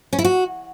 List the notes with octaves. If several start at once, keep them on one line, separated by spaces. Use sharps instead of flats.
C#4
E4
F#4